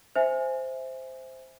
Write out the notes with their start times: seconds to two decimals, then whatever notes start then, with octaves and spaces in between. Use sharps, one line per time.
0.16 C5 E5 G#5